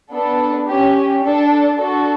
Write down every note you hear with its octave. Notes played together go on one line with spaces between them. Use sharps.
B3 D4 A4
C#4 G4
D4 A4
D4 F#4 A4